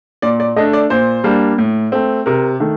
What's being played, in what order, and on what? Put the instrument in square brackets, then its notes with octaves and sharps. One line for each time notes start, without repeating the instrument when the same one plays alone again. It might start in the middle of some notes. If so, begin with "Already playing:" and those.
[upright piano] A#2 D5
D5
A3 D4 D#5
D5
A#2 C5
G3 A#3 D4
A2
A3 C4
C3 A#4
D#3 A3